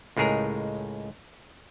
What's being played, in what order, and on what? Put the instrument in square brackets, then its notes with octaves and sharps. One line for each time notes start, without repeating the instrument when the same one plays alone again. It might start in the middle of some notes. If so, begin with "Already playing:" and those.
[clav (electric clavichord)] C#2 A2 G#3 G#4 A#4